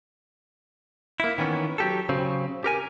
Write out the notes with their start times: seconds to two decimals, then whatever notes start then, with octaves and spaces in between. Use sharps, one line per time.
1.20 A#3 E4
1.38 D#3 E3 B3 C#4
1.78 F#3 G4 A4
2.09 C#3 F#3 C4
2.64 G4 A#4 G#5